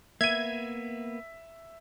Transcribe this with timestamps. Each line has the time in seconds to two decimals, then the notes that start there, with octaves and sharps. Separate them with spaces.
0.21 A#3 B3 E5 G#6 D#7